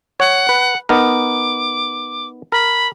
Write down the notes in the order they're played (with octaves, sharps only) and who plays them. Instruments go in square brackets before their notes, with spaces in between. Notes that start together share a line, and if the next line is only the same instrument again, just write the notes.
[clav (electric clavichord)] C#5 [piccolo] F#5
[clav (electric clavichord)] B4
[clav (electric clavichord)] B3 D#4 A#4 [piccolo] D6
[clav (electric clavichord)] A#4 [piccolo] B5